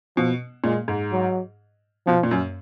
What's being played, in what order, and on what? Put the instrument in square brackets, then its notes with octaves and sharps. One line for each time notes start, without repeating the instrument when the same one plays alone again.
[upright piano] B2 [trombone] F3
[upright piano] A#2 [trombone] G#3
[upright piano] G#2
[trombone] F#3
[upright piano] B2 [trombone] F3
[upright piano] A#2
F#2